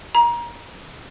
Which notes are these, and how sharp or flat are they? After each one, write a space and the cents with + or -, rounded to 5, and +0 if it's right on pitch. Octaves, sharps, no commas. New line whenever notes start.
A#5 +25